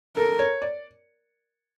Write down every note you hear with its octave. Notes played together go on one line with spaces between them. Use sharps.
A4 A#4
C#5
D5